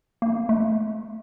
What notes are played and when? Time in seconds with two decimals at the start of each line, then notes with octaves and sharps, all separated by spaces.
0.22 A#3
0.49 A3